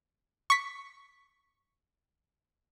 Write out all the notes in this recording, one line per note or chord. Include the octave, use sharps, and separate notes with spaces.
C#6 B6